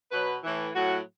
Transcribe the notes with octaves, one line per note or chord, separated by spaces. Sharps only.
B2 F#3 B4
A2 E3
A2 F#3 F#4